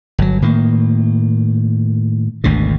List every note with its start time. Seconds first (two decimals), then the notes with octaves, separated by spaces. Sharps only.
0.18 G1 F#3
0.42 A2 D#3 A#3
2.44 G#1 D2 B2 D3